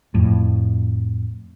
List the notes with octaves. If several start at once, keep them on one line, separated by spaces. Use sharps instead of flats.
F2 A2